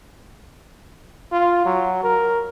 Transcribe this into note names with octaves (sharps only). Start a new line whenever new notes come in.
F4
F#3
A#4